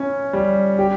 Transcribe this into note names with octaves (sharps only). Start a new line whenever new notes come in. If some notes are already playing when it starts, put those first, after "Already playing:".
Already playing: C#4 E4
G3
G4